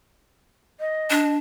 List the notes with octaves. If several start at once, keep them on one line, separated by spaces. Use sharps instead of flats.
D#5
D4